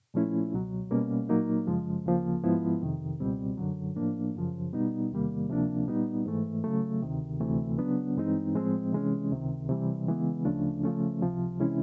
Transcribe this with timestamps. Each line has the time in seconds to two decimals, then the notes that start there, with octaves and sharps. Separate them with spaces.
0.14 A#2 F3 A3 C#4 E4
0.53 C#2 B2 F#3
0.91 B2 G3 A#3 C#4
1.29 A#2 F#3 A#3 D#4
1.67 F#2 C#3 F3 G#3
2.06 D2 C#3 F3 A#3
2.43 G#2 F3 G#3 B3 E4
2.81 F2 C3 D#3
3.20 C#2 B2 G3 C4
3.58 F#2 D3 F#3
3.96 A2 F3 A#3 D4
4.35 F#2 C#3 F3
4.73 B2 G3 B3 D#4
5.11 E2 C3 D#3 G3 A#3
5.49 D2 C3 F3 A#3 D4
5.87 A#2 G3 B3 D#4
6.26 G#2 E3 A3
6.64 C#3 F#3 A3
7.02 D2 C3 D#3
7.40 D2 C3 E3 A3
7.78 C#3 F#3 B3 D4
8.17 G2 E3 G#3 C4 D#4
8.55 A2 F3 G#3 C4
8.93 C3 E3 G#3 C#4
9.31 C#2 C3 D#3
9.69 C3 E3 G3
10.08 C#3 E3 G#3 B3
10.45 D2 C#3 F3 A3 D4
10.83 C#3 F3 A3 C#4
11.22 C#2 C3 F3
11.60 C3 E3 G#3 C#4 E4